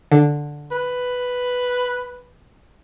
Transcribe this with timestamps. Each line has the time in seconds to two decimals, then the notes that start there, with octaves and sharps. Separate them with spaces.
0.12 D3
0.71 B4